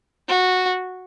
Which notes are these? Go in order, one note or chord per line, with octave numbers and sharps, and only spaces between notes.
F#4